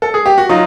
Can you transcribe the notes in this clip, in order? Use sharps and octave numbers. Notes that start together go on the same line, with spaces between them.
A4
G#4
G4
F#4
F#3 D#4 F4